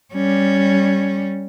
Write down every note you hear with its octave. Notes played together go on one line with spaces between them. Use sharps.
G3 C#4